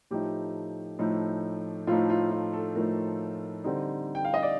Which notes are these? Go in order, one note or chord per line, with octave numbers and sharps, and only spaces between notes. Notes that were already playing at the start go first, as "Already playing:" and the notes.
A2 F3 A3 D#4 G4
A2 F3 A3 D#4
A2 F3 A3 D#4 F4
F4
F4
A4
A2 F3 A3 D#4 A#4
D3 G3 C4 D#4
G5
F5
D#5
D5